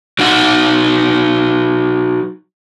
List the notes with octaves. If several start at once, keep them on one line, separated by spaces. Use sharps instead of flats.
F#3 D#4 F#5